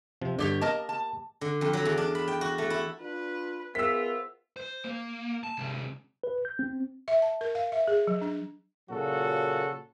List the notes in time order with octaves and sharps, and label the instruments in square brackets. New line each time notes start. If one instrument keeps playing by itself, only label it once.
[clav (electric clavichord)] C3 F3
[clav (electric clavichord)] G2 D3 [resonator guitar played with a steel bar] G3 G4 C#5
[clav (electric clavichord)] A#3 [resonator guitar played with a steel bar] A#4 D#5 A5
[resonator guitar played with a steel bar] A5
[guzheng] D3
F2
F#3
E2
D4
B5
G5
F#4
A3
E4
[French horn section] D4 F4 [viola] B4
[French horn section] B3 G#4 [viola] F4 [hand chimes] A#4 C5 E5 [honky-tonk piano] E6 B6
[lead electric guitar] C5
A#3
A5
C3 G#3
[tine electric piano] B4
G6
C4
[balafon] E5
A5
A#4
F5
E5
G#4
F#3
D4
[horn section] A#2 C#3 F#3 F#4 A4